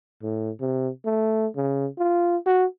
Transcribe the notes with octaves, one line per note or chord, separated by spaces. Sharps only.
A2
C3
A3
C#3
F4
F#4